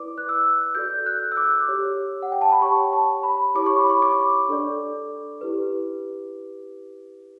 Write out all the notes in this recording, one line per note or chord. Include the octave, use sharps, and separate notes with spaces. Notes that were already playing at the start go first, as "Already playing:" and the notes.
Already playing: E4 B4 D5 D6
F#6
E6
F#4 A4 D5 G6
F#6
E6
D6
G4 C#5
F#5
G5
A5
B5
G4 C#5 C#6
A5
B5
E4 G4 C#5 D6
C#6
B5
C#6
D6
D4 A4 D5
E4 G4 B4